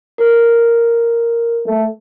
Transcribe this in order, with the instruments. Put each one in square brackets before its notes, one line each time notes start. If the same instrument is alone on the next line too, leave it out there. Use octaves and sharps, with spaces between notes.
[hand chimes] A#4
[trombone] A3